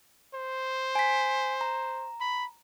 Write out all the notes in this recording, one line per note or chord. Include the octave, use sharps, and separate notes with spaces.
C5
G#5 B6
A#5
B5